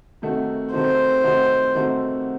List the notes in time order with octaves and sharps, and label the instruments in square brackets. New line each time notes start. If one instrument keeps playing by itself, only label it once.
[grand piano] C3 D#3 A3 D#4 F#4
[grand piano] C3 D#3 A3 D#4 F#4 [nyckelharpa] C5
[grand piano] C3 D#3 A3 D#4 F#4
C3 D#3 A3 D#4 F#4